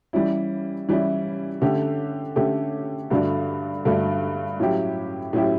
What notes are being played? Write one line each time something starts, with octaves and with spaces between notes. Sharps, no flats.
E3 G3 C#4 E4
E3 G3 C#4 E4
D3 A3 C#4 G4
D3 A3 C#4 G4
G2 D3 A3 D4 F#4
G2 D3 A3 D4 F#4
A2 F#3 C#4 E4 G4
A2 F#3 C#4 E4 G4